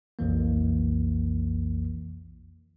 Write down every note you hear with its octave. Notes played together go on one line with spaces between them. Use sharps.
B1 F2 E3 A#3